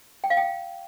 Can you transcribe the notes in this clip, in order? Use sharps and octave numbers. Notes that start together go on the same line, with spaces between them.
G5
F5
G5